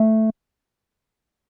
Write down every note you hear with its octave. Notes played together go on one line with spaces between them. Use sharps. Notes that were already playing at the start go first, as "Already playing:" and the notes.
Already playing: A3